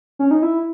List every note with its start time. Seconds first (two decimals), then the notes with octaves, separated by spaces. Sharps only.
0.19 C#4
0.31 D#4
0.42 E4